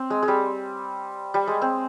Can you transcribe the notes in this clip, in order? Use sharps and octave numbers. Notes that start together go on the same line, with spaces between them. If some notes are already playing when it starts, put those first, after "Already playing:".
Already playing: C4
G#3
G#3
G3
G3
G#3
C4